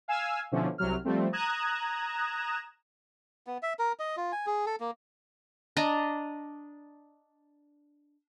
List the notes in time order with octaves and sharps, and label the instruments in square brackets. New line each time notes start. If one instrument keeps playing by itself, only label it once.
[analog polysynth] F5 G#5 E6
B2 D3 F3 C#4 E4
C2 C3 F#3 F6
F3 G3 A3 C4
A#5 D#6 F#6 G#6 E7
[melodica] B3
E5
A#4
D#5
F4
G#5
G#4
A4
A#3
[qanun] D4 D#5 A#5